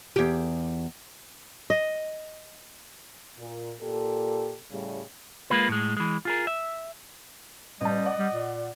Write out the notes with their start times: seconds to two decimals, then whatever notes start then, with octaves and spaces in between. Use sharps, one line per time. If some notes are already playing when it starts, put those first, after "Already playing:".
0.16 E2 G4
1.70 D#5
3.38 A#2
3.81 A#2 G4 A4
4.71 A2 C#3 G3
5.50 G#3 A#3 F4 B4
5.69 A2 G#3
5.97 E3 G#3
6.25 F4 G#4 A#4
6.47 E5
7.81 A1 G3 D#5 A5
8.06 D5 F#5 D6
8.19 G3
8.33 A#2